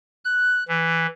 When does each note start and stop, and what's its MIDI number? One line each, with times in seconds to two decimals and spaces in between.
0.25 0.64 90
0.68 1.06 52